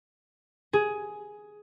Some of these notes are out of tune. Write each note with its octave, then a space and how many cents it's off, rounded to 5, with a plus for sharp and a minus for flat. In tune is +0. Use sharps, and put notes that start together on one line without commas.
G#4 +10